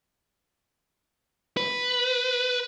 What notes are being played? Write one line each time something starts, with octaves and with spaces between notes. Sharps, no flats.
B4